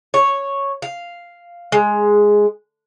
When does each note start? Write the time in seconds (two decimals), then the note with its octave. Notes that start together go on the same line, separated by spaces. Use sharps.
0.14 C#5
0.82 F5
1.72 G#3